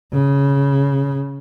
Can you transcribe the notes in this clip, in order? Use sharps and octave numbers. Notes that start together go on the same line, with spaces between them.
C#3